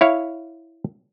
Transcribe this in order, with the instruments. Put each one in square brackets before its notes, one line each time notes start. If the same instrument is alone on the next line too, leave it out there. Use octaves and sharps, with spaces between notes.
[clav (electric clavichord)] E4 C#5 F5